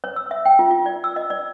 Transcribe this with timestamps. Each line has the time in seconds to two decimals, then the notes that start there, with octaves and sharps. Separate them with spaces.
0.04 C#5
0.16 E6
0.31 E5
0.45 G5
0.59 F4
0.71 F4
0.86 D5
1.04 E6
1.16 D#5
1.30 D5